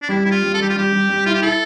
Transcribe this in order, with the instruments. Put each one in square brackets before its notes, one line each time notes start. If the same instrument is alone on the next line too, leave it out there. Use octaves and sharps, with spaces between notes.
[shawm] D4
[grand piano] G3 [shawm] E4
[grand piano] G3 [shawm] E4
[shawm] F4
[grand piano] G3
[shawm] A4
[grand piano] G3 [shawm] G4
[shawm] F4
[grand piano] G3 [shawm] G4
[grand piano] G3
G3
[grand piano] E4 [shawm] F4
[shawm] G4
[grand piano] E4 [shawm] A4